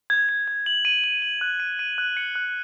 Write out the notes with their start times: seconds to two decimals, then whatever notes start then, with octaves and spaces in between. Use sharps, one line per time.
0.10 G#6
0.29 G#6
0.48 G#6
0.66 F#7
0.85 D#7
1.04 D#7
1.22 F#7
1.41 F#6
1.60 D#7
1.79 D#7
1.98 F#6
2.17 C#7
2.35 F#6